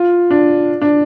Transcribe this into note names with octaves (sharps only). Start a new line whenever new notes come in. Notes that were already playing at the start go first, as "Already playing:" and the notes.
Already playing: F4
D4
D4